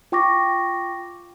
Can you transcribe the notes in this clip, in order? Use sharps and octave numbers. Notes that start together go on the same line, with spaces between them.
F4 G5 C#6 D6 A#6